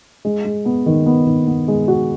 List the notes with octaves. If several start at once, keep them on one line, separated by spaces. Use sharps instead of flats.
G#3
G#3
B3
D#3
B3
D#3
B3
G#3
F#4